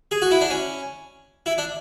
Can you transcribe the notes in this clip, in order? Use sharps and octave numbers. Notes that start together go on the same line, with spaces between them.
G#4
F#4
E4
D4
C#4
E4
D4